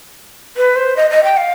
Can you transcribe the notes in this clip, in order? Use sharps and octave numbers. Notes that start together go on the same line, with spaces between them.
B4
C5
D#5
D#5
G5
F5